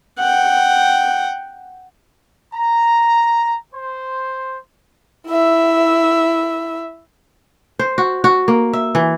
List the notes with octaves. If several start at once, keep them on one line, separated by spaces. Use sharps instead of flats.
F#5 G5
A#5
C5
E4 E5
C5
F#4
F#4
A#3
E5
E3